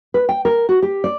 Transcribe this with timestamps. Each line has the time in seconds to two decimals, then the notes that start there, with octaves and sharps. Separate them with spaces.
0.14 B4
0.29 G5
0.45 A#4
0.69 F#4
0.82 G4
1.04 D5